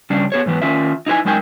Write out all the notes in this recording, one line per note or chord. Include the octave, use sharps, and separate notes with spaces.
C#3 G3 C#4 D4
B3 G#4 C#5
G#2 E3 B3
D#3 C#4 F4 E5
D#4 E4 B4 G#5
F#2 G#3 D#4 A#4 G5 G#5